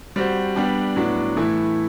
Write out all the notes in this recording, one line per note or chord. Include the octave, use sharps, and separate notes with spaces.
G3 C4 F#4 C5
G3 B3 D4 G4
A2 F#3 B3 D4
A2 E3 A3 E4